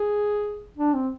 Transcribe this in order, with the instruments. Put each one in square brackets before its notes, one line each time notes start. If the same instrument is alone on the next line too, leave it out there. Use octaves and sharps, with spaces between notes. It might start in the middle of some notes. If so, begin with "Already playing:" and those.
Already playing: [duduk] G#4
D4
C4